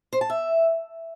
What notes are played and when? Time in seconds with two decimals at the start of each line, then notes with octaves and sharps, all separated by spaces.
0.13 C5
0.21 A5
0.30 E5